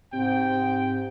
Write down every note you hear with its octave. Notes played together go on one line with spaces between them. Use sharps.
G#2 C3 G5